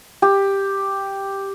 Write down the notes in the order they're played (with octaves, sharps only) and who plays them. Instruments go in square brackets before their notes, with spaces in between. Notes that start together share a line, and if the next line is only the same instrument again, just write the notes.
[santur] G4